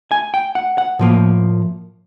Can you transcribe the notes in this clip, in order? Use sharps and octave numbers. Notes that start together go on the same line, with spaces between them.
G#5
G5
F#5
F#5
A2 F3 A#3